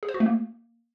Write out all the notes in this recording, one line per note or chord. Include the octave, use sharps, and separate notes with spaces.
G#4
C5
F#4
A3
A#3